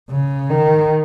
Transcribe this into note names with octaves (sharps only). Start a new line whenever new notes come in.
C#3
D#3